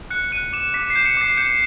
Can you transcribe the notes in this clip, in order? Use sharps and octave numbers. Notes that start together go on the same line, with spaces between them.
F#6 C#7
F#6 D#7
D6 E7
D6 B6
C7
G6
C#7
D6 C7
G6 C#7